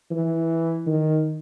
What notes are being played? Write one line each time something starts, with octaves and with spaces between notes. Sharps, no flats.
E3
D#3